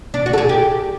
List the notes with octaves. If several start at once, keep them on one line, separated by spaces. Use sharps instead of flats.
D4
F#4
A4
G#4
G4